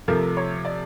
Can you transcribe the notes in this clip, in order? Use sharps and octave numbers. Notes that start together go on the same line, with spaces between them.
C3 F3 A3 A#4
C#5
D5